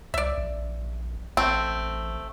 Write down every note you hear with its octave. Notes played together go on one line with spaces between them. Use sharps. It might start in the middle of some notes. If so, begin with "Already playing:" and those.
C2 D5 E5
A#1
A1 A3 C4